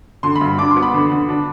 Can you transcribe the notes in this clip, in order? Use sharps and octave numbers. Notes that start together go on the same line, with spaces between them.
D3 C6
B5
G2
D4 D6
C6
B3
B5
D3
D3
D4